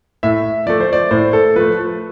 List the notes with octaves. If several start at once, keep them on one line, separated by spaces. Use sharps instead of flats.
A2 E5
F3 A3 D5
C5
D5
A2 C5
A4
F3 A3 B4